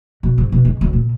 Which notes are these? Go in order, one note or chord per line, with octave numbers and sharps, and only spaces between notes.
B2
G#2
B2
G#3
D2
A#2